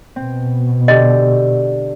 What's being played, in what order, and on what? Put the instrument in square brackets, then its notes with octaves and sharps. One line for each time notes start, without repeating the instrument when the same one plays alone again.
[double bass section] B2 [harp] C4
[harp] D3 G4 [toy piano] D#5